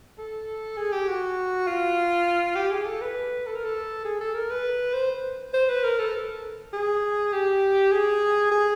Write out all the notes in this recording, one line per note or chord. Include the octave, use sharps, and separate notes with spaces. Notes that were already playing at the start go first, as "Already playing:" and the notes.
A4
G#4
G4
F#4
F4
G4
G#4
A4
B4
A4
A#4
A4
G#4
A4
A#4
B4
C5
C5
B4
A#4
A4
G#4
G4
G#4
G#4